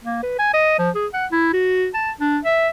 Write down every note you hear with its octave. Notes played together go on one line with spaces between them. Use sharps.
A#3
B4
G#5
D#5
F3
G#4
F#5
E4
F#4
A5
D4
E5